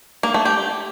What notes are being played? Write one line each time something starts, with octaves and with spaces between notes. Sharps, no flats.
A#3
A3
G4